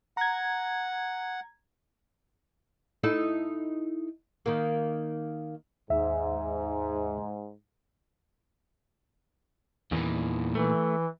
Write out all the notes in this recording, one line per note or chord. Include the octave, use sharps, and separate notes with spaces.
F#5 A#5 G#6
D#4 E4 A4
D#3 A#3
D#2 G#2 E5
E2 A#2 D#3 E3
E3 A3